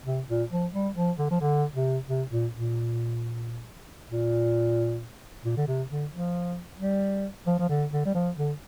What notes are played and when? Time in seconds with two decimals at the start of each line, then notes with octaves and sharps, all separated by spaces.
0.05 C3
0.28 A#2
0.51 F3
0.74 G3
0.96 F3
1.18 D3
1.31 F3
1.41 D3
1.74 C3
2.08 C3
2.31 A#2
2.53 A#2
4.10 A#2
5.45 A#2
5.57 D3
5.68 C3
5.90 D3
6.12 F3
6.80 G3
7.47 F3
7.59 F3
7.69 D3
7.92 D3
8.05 G3
8.14 F3
8.37 D3